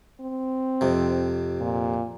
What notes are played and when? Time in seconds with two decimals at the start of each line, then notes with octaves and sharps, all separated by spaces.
0.21 C4
0.81 F2 C3
1.61 A#2